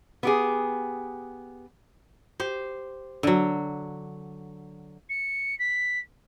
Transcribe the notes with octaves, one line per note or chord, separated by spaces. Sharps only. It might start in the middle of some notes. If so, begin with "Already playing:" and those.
B3 G4 G#4
G4 C5
D3 F#3
C#7
B6